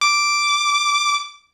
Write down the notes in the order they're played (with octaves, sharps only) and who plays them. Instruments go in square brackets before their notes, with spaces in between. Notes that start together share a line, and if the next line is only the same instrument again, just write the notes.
[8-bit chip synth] D6